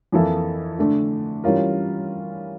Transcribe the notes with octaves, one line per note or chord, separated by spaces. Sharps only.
F2 E3 A#3 E4 A4
D3 A3 D4
E3 G3 C#4 F4 A#4